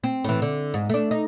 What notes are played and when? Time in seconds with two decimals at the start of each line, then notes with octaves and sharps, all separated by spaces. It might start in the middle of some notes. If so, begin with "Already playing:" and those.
0.04 C4
0.24 A2 E3
0.42 D3
0.74 G#2
0.89 A3 D4
1.11 D#4